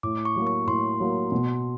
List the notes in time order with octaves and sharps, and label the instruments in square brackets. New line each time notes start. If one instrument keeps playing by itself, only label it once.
[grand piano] A2 [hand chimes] D6
[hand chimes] C#6
[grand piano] F#3 A#3
[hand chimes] C#6
[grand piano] A2 [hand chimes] C6
[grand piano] F#3 A#3
B2